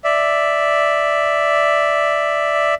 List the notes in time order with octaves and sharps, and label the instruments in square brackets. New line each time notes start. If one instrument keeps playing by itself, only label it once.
[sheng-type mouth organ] D5 E5